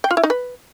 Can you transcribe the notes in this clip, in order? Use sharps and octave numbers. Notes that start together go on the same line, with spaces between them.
G5
F4
E4
D#4
B4